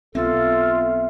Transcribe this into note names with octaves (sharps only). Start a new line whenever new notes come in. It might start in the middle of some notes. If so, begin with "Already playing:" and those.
B1 B3 C4 F4 A4 E5